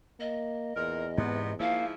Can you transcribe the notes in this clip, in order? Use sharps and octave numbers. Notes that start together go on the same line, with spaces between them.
A#3 D#5
E2 A#2 A#4
G#2 C3 B3
G#2 F3 A#3 E4 F5